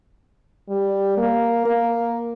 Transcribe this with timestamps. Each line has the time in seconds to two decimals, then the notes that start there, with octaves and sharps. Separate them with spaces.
0.69 G3
1.18 A#3
1.66 A#3